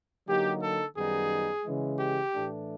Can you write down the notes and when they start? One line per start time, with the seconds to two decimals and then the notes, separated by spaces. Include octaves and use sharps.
0.28 D3 F#3 A#3 D#4 G4
0.62 A4
0.96 F#2 D#3 G3 B3 D#4 G#4
1.64 C#3 E3 G#3
1.99 G4
2.33 A2 E3 A3 D4